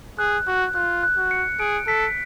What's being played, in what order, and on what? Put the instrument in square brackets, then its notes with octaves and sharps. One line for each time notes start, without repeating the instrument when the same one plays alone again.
[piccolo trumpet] G#4 [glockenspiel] F#6
[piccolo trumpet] F#4 [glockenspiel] F#6
[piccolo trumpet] F4 [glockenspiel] F#6
[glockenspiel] F#6
[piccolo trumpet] F#4
[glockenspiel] C#7
[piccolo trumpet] G#4 [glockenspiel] D7
[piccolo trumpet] A4 [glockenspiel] B6